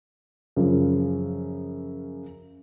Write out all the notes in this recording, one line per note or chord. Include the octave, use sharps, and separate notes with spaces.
F#2 C#3 F3